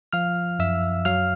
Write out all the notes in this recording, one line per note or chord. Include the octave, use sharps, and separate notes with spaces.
F3 F5 F6
F#2 E5 E6
F#3 F5 F6